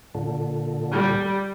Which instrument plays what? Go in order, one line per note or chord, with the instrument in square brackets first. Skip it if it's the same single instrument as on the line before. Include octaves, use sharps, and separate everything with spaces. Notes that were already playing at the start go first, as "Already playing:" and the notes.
[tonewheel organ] A#2 D3
[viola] G3